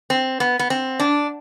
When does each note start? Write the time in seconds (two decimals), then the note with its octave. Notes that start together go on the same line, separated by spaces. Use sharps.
0.10 C4
0.40 B3
0.59 B3
0.70 C4
1.00 D4